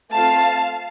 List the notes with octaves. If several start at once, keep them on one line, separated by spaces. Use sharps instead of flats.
A3 C4 F4 F5 A5